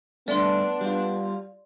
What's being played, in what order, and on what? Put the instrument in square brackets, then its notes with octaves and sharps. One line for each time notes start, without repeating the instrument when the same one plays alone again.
[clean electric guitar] G2 D3 A3 [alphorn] B3 [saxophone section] D4 [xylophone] D5 C6
[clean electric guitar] G3 F4